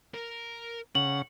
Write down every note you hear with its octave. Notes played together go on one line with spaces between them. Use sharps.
A#4
C#3 F#5 F#7